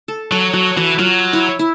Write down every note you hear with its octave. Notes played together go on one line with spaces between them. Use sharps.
A4
F#3 A4
F#3 F#4
E3 F#4
F#3 F4
E4
E4